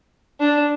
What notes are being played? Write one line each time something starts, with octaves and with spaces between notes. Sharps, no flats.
D4